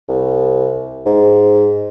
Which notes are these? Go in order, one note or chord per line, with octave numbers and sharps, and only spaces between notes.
C2
G#2